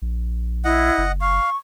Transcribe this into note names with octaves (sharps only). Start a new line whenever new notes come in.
A#1
E4 D#5 F#5
F#1
F5 C#6